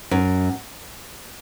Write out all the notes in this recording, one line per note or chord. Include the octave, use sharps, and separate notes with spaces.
F#2